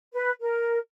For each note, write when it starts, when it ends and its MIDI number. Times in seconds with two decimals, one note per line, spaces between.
0.13 0.30 71
0.41 0.77 70